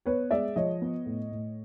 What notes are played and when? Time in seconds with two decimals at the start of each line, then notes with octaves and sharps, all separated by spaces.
0.06 B3 B4 C#5
0.31 G#3 D5 E5
0.56 F3 C#5 D#5
0.82 B3
1.06 A2
1.31 A2